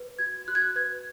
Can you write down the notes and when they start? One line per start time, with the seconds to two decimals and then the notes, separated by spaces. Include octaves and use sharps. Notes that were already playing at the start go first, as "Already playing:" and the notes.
Already playing: B4
0.19 F#4 G#6
0.48 F#4 F#6
0.55 G#6
0.62 F#6
0.76 B4 G#6